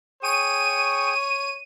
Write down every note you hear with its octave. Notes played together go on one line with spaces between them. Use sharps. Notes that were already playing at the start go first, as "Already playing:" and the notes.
G#4 C#5 G5 C#6 D#7